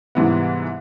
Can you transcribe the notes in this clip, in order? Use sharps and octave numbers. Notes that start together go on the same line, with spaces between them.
G#2 C3 E3 G3 B3